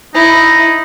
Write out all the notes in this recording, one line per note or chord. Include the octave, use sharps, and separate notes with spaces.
D#4 E4